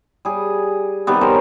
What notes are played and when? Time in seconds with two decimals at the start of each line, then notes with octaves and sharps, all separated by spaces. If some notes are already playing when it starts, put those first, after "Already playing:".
0.25 G3 G#4
1.07 C3 D#3 G3 B3
1.21 G#4 A#4 C5 C#5